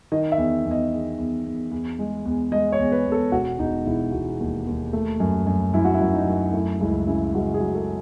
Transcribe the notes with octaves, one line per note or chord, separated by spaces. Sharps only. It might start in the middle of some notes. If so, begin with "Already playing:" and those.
D#3 D#5
E5
E2
E2
D#5
E2
E2
E2
E2
G#3
E2
G#3 D#5
C#5
E2
B4
E2
A4
E1 F#4
E1 D#4
E1 E4
E1 F#4
D#2
D#2
A3
F#2
F#2
F#2 E4
F#4
E4
F#2
D#4
F#2
A3 E4
C#2 E4
C#3 E4
C#2 F#4
G#4
F#3
A4